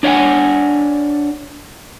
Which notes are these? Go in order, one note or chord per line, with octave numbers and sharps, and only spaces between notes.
D4 C#5 E5 F#5 G#5